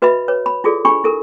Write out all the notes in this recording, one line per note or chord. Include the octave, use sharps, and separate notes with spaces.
F#4 B4 D#5 E5 B5
B4 C#5
B5
E4 F4 G#4 A4 D5
D4 G4 G#5 B5 C#6
E4 A4 A#4